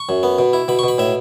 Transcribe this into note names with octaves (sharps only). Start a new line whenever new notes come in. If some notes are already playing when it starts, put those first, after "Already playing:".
Already playing: C#6
F#2
B3
B2
E4
B2 B5
C#6
B2 B5
A2 E5